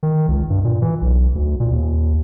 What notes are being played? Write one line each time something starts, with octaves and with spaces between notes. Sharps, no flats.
D#3
C#2
G2
A#2
E3
B1
D2
A#2
D#2